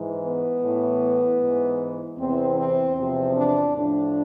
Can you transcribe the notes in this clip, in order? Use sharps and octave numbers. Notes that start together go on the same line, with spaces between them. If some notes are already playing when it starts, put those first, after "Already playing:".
Already playing: G#2 E3
B3
A2 E3
G#2 E3
E2 C3 E3 C4
C4
E2 C3 F3 C4
D4
A2 F3 D4